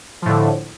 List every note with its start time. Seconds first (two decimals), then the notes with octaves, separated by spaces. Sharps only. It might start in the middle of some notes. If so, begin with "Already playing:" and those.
0.22 F3
0.26 A2
0.29 D3